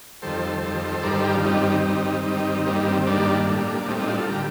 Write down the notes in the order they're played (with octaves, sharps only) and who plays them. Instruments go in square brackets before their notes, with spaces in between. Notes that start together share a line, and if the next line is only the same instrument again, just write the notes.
[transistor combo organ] F2 D#3 G3 A4 C5
F2 D#3 G3
G2 D#3 G3 A#4 D5
A4 C5
G4 A#4
D4 F4
G2 D#3 G3 C4 D#4
C4
C4 D#4
G2 D#3 G3
G2 D#3 G3
G2 D#3 G3 A#3
A#3
C4
G2 D#3 G3 A#3 D4
A2 G3
A2 C4 D#4
G3
C4 D#4
D4 F4
F4 A4
D3 G3 G4 A#4